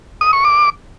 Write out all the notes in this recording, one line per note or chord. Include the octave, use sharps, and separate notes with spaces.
D#6
C#6
D6